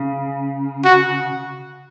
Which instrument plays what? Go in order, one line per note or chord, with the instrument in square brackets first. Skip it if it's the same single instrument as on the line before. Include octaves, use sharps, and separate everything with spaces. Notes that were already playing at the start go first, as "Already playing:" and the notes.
Already playing: [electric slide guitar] C#3
[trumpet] F#4